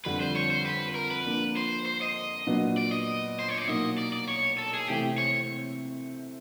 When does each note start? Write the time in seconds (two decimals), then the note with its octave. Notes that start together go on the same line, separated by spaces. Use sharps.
0.05 F2 D3 G3 B4
0.21 C5
0.36 C#5
0.51 C5
0.66 B4
0.96 A#4
1.11 B4
1.25 F3 A#3 D4
1.57 C5
1.86 C5
2.02 D#5
2.47 A#2 F#3 B3 D4
2.77 D5
2.92 D#5
3.39 C5
3.48 C#5
3.58 D5
3.68 B2 F#3 A#3 D#4 D#5
3.98 D5
4.13 D5
4.28 C#5
4.58 A4
4.74 G#4
4.88 C3 E3 A3 C4 G4
5.18 C#5